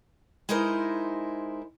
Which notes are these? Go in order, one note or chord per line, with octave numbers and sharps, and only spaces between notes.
G#3 D#4 E4 A#4 C5